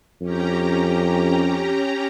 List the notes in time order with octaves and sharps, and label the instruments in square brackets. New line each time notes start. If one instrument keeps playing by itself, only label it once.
[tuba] F2 [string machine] C#4 G4 A#5